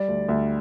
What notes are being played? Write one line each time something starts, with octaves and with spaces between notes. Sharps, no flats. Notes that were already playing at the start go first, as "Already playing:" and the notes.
Already playing: G3 D5
D2
D2